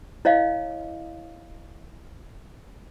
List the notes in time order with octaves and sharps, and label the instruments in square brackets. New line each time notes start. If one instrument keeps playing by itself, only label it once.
[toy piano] E4 C#5 D#5 F5